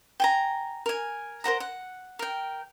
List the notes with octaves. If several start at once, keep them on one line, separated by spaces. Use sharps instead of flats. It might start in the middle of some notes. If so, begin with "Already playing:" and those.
G5 G#5 A#5
A#4 G#5
A#4 C5 F#5 A#5
F#5
A#4 G5